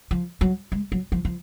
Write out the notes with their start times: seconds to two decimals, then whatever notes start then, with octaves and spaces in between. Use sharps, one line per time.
0.11 F3
0.41 F#3
0.72 G#3
0.92 F#3
1.12 F3
1.25 F3